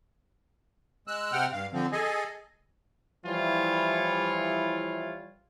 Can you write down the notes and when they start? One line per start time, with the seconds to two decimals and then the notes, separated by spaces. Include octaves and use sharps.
1.08 G#3 E6 F#6
1.32 C3 C4 F#5 G5 F6
1.53 G2 F5
1.73 D3 F3 C4
1.92 G#4 A4 D#5 G#5
3.26 E3 F3 G3 E4 F4 C#5